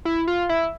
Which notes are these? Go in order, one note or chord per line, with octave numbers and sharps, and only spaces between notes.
E4
F4
E4